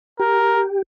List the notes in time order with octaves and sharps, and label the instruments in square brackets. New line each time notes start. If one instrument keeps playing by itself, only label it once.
[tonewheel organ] G4 [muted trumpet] A#4